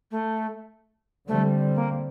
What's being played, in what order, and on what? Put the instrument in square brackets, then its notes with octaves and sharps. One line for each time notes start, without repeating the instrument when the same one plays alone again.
[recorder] A3
[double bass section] D3 G3 C4 [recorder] A3
[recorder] A#3